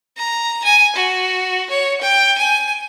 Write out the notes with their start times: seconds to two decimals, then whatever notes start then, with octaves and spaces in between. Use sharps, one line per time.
0.17 A#5
0.64 G#5
0.96 F#4
1.70 C#5
2.02 G5
2.38 G#5